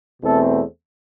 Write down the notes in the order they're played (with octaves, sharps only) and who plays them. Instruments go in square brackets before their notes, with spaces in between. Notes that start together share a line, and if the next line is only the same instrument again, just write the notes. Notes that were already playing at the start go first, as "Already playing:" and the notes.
[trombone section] E2 B2 A3 C4 A4